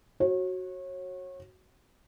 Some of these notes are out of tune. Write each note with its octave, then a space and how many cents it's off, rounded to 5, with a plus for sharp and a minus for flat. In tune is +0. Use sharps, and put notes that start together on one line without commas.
F#4 +0 C#5 -30